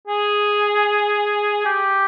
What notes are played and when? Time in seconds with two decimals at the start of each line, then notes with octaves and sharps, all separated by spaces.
0.08 G#4
1.65 G4